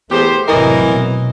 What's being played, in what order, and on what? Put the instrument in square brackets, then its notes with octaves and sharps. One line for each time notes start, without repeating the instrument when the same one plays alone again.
[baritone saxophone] E2 [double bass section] A3 [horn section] B3 G4 C5
[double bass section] F1 A2 F#3 [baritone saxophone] E3 [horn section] A#4 D#5
[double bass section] B2